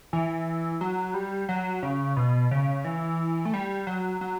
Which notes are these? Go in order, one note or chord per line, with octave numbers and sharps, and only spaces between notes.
E3
F#3
G3
F#3
C#3
B2
C#3
E3
A3
G3
F#3
F#3